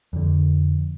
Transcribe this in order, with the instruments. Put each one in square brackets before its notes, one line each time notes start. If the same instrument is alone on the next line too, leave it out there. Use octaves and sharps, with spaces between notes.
[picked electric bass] F2 D3